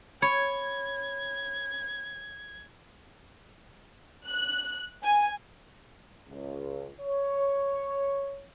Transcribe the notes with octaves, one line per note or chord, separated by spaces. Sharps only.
C#5 B5 G#6
F#6
G#5
C#2
C#5